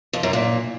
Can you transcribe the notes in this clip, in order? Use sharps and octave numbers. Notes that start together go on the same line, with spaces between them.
F2
F#2
A#2